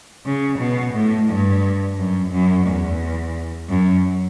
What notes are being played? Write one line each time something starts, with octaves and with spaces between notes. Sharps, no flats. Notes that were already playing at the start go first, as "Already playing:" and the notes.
C#3
B2
A2
G2
F#2
F#2
E2
F#2